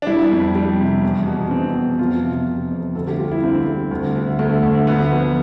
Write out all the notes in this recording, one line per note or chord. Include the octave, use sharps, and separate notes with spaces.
D4
G3 E4
F2
G3
C3
E2
B2
E2 C4
B2
F2 F4
C3
C3
F2
D2 A4
G4
G3 F4
E4
D3 C4
G3
D2
D2
D2 A3
D2
D2 B3
F3